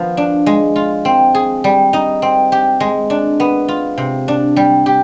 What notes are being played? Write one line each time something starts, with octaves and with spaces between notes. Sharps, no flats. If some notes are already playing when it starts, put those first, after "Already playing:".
Already playing: F3 B3
D4
G#3
F4
C4
G#4
G3
D#4
C4
G4
G#3
D4
B3
F4
C3
D4
G3
G4